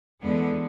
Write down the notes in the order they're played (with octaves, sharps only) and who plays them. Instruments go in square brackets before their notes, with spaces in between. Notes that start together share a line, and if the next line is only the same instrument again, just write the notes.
[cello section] E2 D3 G#3 B3